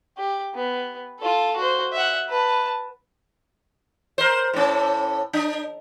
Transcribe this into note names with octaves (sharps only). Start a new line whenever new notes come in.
G4
B3
F4 A4
F#4 C5
E5 F#5
B4 A5
A#4 C5
A2 C#4
D4